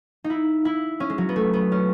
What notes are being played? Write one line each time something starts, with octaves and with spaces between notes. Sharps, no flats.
D#4
E4
E4
C#4
G#3
F#3
B3
A3
B3
C#4